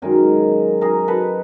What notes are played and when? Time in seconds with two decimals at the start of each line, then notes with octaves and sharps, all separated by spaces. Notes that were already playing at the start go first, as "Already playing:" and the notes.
0.02 F#2 D#3 G#3 G#4 A#4
0.81 G#4 A#4
1.08 A4 B4